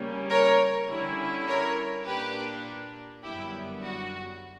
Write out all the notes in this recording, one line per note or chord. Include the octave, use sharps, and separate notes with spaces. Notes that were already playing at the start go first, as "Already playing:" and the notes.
Already playing: C#3 G3 A#3 C#4
A#4 C#5
D3 G3 C#4 E4
A#4 C#5
A#2 A#3 D4 G4 B4
F#2 D3 G3 B3 E4 G4
F#4